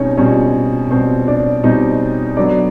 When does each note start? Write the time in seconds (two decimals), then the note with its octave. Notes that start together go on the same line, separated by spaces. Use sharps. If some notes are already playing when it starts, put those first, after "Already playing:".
Already playing: B2 G3 C4 C#4 D#4 C#5
0.17 B2 G3 C4 C#4 C#5
0.90 B2 G3 C4 C5
1.28 D4 D5
1.63 B2 G3 C4 D#4 D#5
2.37 D3 F#3 B3 D4 D5